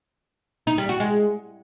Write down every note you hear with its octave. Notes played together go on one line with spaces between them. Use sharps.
D#4
G3
F#4
G#3